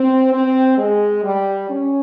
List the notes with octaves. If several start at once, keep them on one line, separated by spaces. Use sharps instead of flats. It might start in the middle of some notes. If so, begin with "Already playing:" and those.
Already playing: C4
C4
G#3
G3
C#4